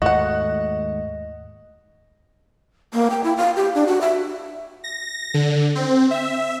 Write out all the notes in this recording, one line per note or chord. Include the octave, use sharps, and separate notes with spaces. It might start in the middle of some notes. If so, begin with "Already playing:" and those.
D#2 G#2 A3 F#4 D#5 F#5
A#3
G5
E4
F5
G4
D4
F#4
E5
A#6
D3
C4
E5